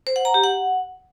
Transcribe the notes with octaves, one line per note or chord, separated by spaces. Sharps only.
C5
F#5
A#5
G4
F#5